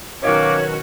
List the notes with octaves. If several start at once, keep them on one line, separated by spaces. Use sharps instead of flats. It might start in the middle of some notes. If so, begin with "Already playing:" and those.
B2 D#3 F#3 C#4 F#4 C#5 F5 D6